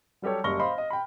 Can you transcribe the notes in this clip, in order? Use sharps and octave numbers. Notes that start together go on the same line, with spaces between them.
F#3 G3 G4 A4 C#5
F#1 G3 C#6 F6 A#6 G7
C5 D#5 F5 B5 C6
D#5
G5 B5